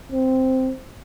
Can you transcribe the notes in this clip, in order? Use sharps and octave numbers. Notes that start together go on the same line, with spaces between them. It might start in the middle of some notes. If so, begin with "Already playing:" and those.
C4